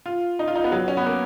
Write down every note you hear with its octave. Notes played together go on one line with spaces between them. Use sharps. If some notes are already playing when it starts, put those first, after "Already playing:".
F4
D#4
F4
D#4
B3
F#3
C#4
B3
A#3